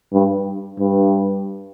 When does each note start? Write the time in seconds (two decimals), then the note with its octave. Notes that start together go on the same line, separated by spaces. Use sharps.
0.13 G2
0.79 G2